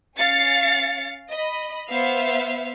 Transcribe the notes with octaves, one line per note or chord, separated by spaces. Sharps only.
C#4 F5 A6 C#7
D#5 B5
B3 C5 E5 F5